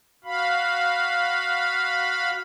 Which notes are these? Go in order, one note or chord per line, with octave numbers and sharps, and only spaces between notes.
F#4 F5 B5